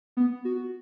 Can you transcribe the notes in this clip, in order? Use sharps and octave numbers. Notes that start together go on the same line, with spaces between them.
B3
F#4